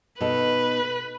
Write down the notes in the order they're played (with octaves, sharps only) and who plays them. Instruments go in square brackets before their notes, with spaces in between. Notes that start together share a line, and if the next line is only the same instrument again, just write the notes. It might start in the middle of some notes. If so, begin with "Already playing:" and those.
[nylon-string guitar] B2 D#4 A4 [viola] B4